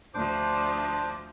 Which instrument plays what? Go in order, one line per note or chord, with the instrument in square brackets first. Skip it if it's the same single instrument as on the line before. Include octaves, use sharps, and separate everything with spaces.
[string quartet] D2 F3 [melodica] D4 C5 D6